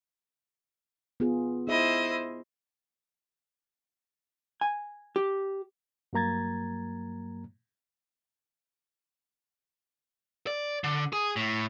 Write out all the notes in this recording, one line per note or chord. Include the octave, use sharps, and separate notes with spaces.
B3 F4 G#4
D#4 E4 G#4 C5 D#5 E5
G#5
G4
G2 F#3 A#3 A#5 G#6 A6
D5
D3
G#4
A2